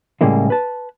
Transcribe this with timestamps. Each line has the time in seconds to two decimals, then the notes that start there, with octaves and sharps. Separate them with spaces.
0.21 A2 C#3 G3 G#3 A#3 E4
0.50 B4 A5